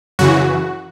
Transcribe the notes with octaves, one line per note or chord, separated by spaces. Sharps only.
F#2 C#3 E3 F#4